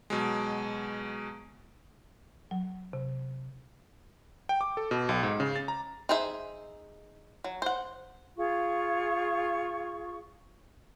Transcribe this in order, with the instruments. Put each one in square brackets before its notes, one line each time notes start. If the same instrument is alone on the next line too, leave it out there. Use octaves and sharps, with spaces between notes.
[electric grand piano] B2 F#3 G#3
[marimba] F#3
C3
[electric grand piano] G5
D6
A4
B2
B1
G#2
C#3
A6
A#5
[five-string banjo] D#4 G#4 C5 E5
F#3
C5 F#5
[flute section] F4 G#4 C#6